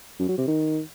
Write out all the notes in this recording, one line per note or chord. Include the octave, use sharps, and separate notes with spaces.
F#2
F#3
C3
D#3